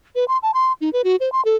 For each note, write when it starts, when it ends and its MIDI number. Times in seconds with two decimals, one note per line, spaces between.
0.15 0.25 71
0.28 0.38 84
0.43 0.51 81
0.54 0.73 84
0.81 0.90 63
0.93 1.02 71
1.04 1.16 66
1.20 1.32 72
1.32 1.44 84
1.45 1.56 69